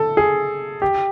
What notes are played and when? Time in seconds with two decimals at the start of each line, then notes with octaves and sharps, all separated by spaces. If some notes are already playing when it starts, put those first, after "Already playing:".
Already playing: A4
0.17 G#4
0.82 G4